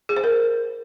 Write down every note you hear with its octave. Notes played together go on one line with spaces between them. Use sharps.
G#4
C5
A#4